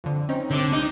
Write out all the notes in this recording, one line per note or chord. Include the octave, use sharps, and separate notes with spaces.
F2 D3
C4 C#4 D#4
C2 D3 C4 D6
D#4